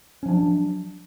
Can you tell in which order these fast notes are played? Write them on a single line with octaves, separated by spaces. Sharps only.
C#4 F3 D4 F#3